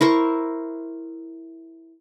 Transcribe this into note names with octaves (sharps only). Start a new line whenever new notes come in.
E4 A#4 C5 C#6